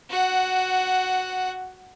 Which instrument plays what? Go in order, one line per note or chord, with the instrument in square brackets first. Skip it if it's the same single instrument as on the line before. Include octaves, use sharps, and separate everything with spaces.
[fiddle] F#4 F#5